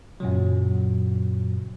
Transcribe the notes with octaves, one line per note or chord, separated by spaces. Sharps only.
F#2 A#2 C#3 F#3